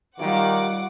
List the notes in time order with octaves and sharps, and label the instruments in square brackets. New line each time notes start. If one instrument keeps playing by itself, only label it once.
[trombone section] D#3 [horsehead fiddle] G3 [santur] F4 C#5 F5 [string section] F#5 D6